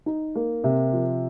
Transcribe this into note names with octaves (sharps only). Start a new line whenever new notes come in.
D#4
A#3
C3
F3